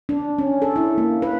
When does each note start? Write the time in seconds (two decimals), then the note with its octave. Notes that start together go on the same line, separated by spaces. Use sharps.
0.09 D4
0.38 C#4
0.62 A4
0.76 E4
0.98 A#3
1.22 B4